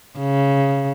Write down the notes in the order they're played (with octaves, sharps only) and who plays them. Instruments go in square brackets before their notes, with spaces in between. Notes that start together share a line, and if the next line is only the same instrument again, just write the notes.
[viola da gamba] C#3